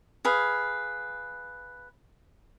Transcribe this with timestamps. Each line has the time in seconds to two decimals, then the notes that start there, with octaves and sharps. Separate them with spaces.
0.25 G#4 B4 F5